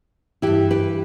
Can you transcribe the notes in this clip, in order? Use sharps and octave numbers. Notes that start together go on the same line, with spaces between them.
G2 E3 E4 G4
G4 B4